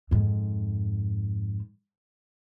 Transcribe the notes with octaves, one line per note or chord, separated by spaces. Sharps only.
F2 G#2